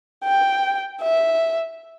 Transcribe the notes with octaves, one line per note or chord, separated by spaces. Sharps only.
G5
E5